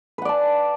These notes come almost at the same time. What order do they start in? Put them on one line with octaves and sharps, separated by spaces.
B4 F#5 D5 A5